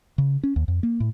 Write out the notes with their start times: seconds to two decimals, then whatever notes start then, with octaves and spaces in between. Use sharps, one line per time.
0.18 C#3
0.43 C#4
0.56 D#2
0.68 F2
0.83 A#3
1.00 A2